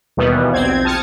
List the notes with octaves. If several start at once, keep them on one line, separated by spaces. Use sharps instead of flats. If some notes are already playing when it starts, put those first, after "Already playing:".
D#2 B2 E3 G3 B3
A#1 C4 G#6
A5 D#6 F6 G#6 C#7